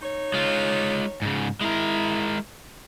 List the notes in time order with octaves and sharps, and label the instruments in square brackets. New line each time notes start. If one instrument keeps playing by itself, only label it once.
[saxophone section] D#4 C#5
[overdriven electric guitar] G#3 F4
G#2 C#3
[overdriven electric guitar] G#3 A#4 [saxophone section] E4